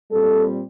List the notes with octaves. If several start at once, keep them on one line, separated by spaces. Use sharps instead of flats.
A#2 G3 C4 A4